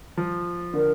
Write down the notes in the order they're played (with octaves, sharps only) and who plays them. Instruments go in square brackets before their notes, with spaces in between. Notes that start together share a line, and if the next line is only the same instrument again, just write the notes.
[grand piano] F3
[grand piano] D3 [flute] A#4